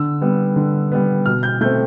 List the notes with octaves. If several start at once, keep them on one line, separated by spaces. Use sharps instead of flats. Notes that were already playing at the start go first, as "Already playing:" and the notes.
Already playing: D3 E6
G3 B3
D3
G3 B3
B2 F6
G6
A3 C4 G6